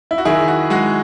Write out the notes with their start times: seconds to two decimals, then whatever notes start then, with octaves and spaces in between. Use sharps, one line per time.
0.11 E4
0.18 F#4
0.25 D#3 E4 G#4
0.48 F#4
0.70 G#3 F#4